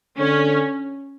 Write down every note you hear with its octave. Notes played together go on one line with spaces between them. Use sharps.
D3 C#4